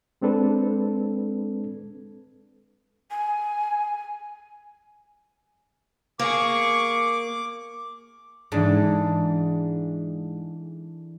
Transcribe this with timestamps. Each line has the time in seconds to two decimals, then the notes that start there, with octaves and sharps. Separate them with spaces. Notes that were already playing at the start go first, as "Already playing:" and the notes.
0.21 G#3 C4 D4 A4 B4
3.11 G#5
6.19 A#3 G#4 C#6 D6
8.52 G#2 E3 D4 A4